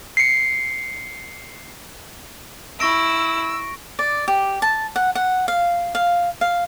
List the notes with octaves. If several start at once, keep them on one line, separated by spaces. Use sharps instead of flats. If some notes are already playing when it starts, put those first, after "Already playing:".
C7 C#7
E4 C#6 E6 A#6 D7
D5
G4
A5
F#5
F#5
F5
F5
F5